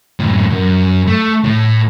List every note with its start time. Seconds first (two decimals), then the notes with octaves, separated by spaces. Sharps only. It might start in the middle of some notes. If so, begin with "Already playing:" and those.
0.20 F#2 A2
0.50 F#2
1.07 A3
1.45 A2